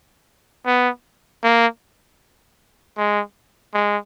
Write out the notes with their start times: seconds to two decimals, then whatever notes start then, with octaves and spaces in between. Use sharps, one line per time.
0.66 B3
1.44 A#3
2.98 G#3
3.74 G#3